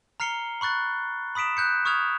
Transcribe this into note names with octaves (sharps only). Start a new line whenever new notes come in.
A#5 F6 C7 C#7 G7
B5 C#6 F#6 A6 C#7
B5 D#6 B6 D7 E7
F#6 G6 C#7
C#6 D#6 F6 G#6 F7